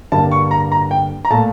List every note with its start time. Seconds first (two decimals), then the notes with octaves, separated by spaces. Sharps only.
0.12 G2 D3 G3 A#3 A5
0.31 C#6
0.51 A#5
0.72 A#5
0.91 G5
1.25 A#5
1.30 A#2 A3 A5